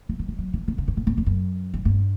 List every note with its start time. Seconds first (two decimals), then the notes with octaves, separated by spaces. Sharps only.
0.09 F3
0.19 F#3
0.28 G3
0.38 F#3
0.53 E3
0.68 D#3
0.78 C#3
0.88 G#2
0.97 A2
1.07 G#2
1.17 F2
1.26 F#2
1.74 G#2
1.85 G2